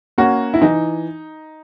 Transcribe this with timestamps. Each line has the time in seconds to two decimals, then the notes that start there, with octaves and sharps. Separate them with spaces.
0.18 A#3 C#4 F#4
0.54 E4
0.61 E3 D#4